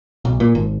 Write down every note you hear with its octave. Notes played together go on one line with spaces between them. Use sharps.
B1
A#2
G#1